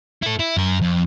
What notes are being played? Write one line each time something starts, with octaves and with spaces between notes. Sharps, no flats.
E4 A4
E4
F#2 A#4
F2